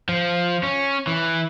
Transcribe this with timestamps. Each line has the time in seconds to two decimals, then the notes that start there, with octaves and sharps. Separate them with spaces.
0.09 F3
0.63 C#4
1.07 E3